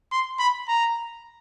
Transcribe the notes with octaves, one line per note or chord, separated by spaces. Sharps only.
C6
B5
A#5